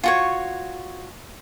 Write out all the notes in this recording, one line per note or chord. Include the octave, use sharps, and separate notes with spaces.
F4 F#4 C#5